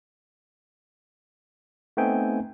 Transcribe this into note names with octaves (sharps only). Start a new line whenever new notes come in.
A3 B3 C4 D#4 G5 G#5